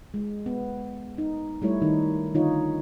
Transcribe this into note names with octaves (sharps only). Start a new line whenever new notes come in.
G#3
B3
D#4
G3 A3 E4 C#5
D#3 D#4
D3 D#3 D#4 F4 C#5